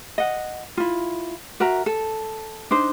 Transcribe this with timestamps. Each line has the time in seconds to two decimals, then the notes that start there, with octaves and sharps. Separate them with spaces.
0.18 D#5 F#5
0.77 E4 F4
1.60 F#4 A#4 E5 A#5
1.86 A4
2.71 D4 D#4 C5